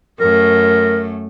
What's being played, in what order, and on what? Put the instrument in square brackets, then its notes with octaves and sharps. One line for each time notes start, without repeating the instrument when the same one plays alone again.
[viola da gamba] F#2 A3 [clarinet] A#4